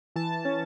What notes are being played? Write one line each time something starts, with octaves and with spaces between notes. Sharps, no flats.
E3 A5
C#4